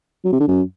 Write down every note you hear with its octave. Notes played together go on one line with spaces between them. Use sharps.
F#3
C3
D3
F#2